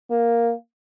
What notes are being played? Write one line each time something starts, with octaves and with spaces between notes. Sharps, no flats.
A#3